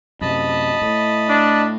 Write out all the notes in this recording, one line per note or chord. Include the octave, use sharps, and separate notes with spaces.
F#2 C3 D#5 A5 B5
A2
D4